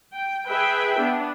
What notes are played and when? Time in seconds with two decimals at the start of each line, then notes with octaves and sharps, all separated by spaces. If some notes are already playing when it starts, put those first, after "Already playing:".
0.15 G5
0.48 G#4 B4 E5 G5
1.01 B3 D4